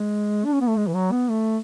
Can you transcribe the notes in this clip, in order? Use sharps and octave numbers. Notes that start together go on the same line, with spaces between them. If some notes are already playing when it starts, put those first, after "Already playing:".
Already playing: G#3
D4
C#4
B3
A3
G#3
E3
F#3
B3
A3